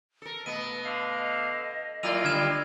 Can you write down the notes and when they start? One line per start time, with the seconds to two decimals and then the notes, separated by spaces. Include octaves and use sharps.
0.22 A4 A#4
0.46 B2 A3 B3 D#5 D#7
0.84 D3 F5
2.03 F#3 A#3 E4 F4 D5 E6 D#7 F7
2.24 D3 G3 F6 G#6 E7